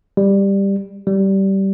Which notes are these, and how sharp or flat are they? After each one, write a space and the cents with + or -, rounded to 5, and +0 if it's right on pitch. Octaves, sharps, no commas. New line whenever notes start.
G3 +10
G3 -15